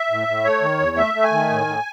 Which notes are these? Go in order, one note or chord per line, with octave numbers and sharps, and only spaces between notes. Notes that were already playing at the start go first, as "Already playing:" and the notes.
Already playing: E5
A2
A2
A3 C#5
D#3
E2
A3 E5
A3
G#5
D#3
A2
A2